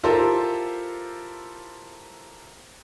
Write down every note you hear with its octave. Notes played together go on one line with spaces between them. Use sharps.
E4 F4 G4 A4 A#4 C5